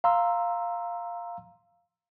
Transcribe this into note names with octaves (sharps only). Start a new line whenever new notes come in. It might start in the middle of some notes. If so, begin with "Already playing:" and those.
F5 A#5 C6 E6